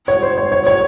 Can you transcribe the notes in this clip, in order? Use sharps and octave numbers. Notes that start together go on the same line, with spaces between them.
C#5
C5
C#5
C#5
C#5